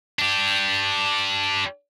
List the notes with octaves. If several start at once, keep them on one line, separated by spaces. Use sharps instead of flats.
D4 G4